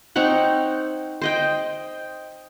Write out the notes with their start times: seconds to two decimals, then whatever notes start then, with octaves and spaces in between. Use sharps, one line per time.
0.16 C4 D#4 C#5 F#5
1.21 C5 D#5 G5